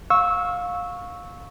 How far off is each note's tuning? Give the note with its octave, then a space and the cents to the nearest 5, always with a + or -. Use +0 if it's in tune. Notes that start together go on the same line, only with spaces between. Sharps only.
F5 +25 C#6 -5 E6 -15